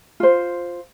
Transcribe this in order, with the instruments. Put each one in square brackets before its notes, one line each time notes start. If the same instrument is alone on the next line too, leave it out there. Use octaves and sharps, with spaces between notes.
[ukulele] F4 C5